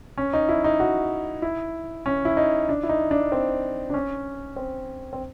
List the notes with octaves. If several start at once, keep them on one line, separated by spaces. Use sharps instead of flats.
C#4
D#4
E4
D#4
F#4
E4
C#4
E4
D#4
D4
E4
D#4
D4
C4
D4
C#4
C4
C4